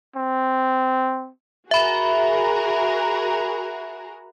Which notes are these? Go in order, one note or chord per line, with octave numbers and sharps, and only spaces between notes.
C4
F#4 G#4 A#4 E5 B5